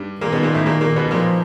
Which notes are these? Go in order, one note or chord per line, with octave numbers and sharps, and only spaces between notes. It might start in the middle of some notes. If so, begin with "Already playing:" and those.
Already playing: G2 G3
A#2 D#3 A#3
B2 B3
A#2 A#3
A2 A3
A#2 A#3
A#2 A#3
B2 B3
A#2 F3 A#3